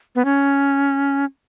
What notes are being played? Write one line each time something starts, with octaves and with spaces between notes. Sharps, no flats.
B3
C#4